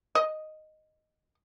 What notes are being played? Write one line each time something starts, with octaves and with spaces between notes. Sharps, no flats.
D#5